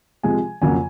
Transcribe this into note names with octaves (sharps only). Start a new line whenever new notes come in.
C3 F3 G#3 G#5
F2 C#3 F#3 A#3 G#5